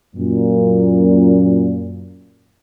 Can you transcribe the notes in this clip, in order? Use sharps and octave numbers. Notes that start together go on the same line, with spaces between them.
F#2 A#2